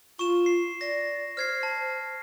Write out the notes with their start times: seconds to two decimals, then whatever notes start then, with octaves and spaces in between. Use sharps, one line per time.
0.19 F4 C#6 E7
0.46 C7
0.81 D5 A#6
1.37 C5 F6 G#6 C7
1.63 A5